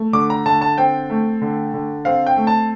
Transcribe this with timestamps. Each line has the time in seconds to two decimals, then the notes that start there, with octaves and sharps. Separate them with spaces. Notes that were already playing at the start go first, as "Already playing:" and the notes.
Already playing: A3
0.13 D3 D6
0.30 A#5
0.46 D3 A5
0.61 A5
0.78 C4 G5
1.10 A3
1.41 D3
1.74 D3
2.05 C4 F5
2.27 G5
2.37 A3
2.47 A5